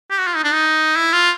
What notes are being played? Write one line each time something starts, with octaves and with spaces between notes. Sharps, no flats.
G4
F#4
F4
D#4
D4
D#4
E4
F4